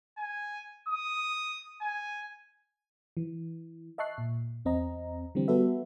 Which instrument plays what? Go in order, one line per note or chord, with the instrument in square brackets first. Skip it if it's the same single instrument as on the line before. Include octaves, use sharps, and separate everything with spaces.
[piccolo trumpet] G#5
D#6
G#5
[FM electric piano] E3
D#5 E5 A5 C#6 F#6 C7
A#2
E2 C4 D#5 A#5
D3 E3 G3 C4
G3 B3 F#4 A4 B4 E5